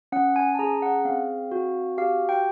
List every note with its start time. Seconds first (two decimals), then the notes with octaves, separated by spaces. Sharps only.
0.12 C#4 F#5
0.36 G#5
0.55 A5
0.59 G#4 A#5
0.82 F#5
1.05 C4 F5
1.51 F#4
1.98 G4 F5
2.29 G5